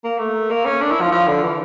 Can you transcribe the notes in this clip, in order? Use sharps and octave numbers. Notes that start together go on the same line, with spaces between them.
A#3
A3
A#3
C#4
D4
E4
F3
F3
D3
E3